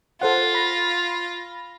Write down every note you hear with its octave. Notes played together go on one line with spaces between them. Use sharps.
F4 A4 C5 F#5
B5 A#6